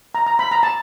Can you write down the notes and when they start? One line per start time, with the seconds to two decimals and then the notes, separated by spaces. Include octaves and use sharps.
0.15 A#5
0.26 A#5
0.39 B5
0.51 A#5
0.63 A5